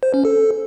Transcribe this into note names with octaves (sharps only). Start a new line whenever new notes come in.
C5
C#4
A4